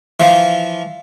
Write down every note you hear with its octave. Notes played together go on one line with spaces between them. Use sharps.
E3 F3